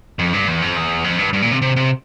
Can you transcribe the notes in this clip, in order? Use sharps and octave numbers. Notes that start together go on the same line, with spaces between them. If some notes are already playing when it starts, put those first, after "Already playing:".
F2
G2
E2
F2
E2
F2
G2
G2
A#2
C3
C3
C3